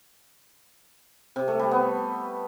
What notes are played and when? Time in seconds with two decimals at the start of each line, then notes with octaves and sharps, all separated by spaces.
1.36 C3
1.48 A3
1.59 G3
1.71 B3